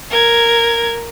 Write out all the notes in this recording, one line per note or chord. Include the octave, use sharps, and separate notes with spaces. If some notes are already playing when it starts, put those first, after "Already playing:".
A#4 G#6